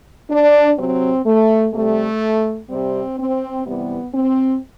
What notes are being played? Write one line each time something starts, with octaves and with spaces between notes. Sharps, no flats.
D4
C3 F#3 C4
A3
C3 G3 A3
C3 G3 C4
C4
C3 E3 G3 B3
C4